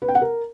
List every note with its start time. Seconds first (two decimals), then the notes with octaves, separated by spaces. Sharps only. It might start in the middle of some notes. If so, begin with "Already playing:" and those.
0.02 B4
0.08 G5
0.15 F#5
0.22 A#4